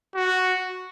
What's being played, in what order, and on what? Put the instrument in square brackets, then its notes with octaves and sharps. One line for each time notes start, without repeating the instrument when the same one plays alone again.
[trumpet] F#4